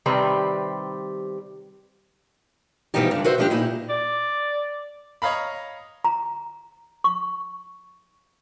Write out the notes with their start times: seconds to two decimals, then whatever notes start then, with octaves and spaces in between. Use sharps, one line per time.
0.06 C3 D#3 G3 C4 B4
2.94 G2 B2 E3 F3 D#4 G4
3.11 G2 D3
3.24 F#4 B4 C5 E5
3.38 F3 G#3 D4 F4 G4
3.50 A#2 D#4 E4
3.89 D5
5.22 C#5 D#5 F5 A#5 B5
6.05 A#5
7.04 C#6